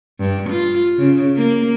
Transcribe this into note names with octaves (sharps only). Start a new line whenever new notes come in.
G2
F4
C#3
A#3